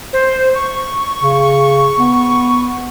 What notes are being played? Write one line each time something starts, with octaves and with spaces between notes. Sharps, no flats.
C5
C#6
C#3
B3